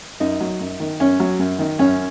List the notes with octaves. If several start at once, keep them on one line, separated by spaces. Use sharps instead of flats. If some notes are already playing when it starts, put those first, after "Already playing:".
F#2 D#4
F#3
F#2
D#3
F#2 C#4
F#3
F#2
D#3
F#2 C#4